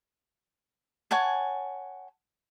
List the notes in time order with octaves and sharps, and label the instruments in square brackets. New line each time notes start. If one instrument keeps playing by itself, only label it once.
[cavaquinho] C#5 F#5 G#5 A5